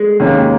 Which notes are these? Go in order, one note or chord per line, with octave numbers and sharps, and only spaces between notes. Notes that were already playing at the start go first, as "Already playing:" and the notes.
Already playing: G#3
D#2 D#3 A#3 C#4